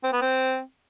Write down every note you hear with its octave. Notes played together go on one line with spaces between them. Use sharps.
C4
B3
C4